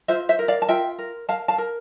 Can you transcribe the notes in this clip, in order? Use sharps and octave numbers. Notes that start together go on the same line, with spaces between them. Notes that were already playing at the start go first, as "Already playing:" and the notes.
F4 C5 E5
C5 E5
A#4
D5 F5
A5
F4 E5 G5
A#4
A#4 F5 A5
F5 A5
A#4